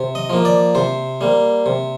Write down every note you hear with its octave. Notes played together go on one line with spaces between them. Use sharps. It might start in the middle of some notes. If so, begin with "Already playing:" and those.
Already playing: C3
D#5
F3 A#3
D5
C3 C5
G3 A#3
C3